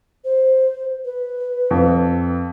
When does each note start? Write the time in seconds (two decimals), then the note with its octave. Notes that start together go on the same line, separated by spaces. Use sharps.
0.25 C5
1.05 B4
1.71 F2